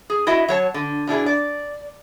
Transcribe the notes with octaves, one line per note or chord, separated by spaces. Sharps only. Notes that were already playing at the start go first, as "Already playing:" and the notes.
G#4
E4 F#4 D#5 E5
F#3 C#5 A5
D3
B2 D4 E4 G#4
D5